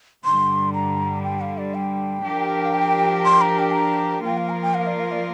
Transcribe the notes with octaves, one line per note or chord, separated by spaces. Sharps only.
G2 D3 G3 C6
A#5
G5
F5
D5
G5
F3 D4 G4 A#4
F5
G5
C6
A#5
G5
A#5
F3 A#3 F4 A#4 G5
F5
A#5
G5
F5
D5
F5
D5